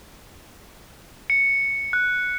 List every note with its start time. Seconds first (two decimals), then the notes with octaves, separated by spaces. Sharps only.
1.30 C#7
1.93 F#6